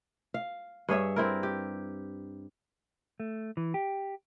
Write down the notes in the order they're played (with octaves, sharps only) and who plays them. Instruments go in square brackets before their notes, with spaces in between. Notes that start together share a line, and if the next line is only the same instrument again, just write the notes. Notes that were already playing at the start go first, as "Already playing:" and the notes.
[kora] F5
G2 G#4 C#5 E5
C4 E4 A#4
G4
[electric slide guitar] A3
E3
G4